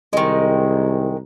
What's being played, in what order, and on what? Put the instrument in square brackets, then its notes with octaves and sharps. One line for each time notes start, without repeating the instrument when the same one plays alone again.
[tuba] C2 [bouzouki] D#3 G#3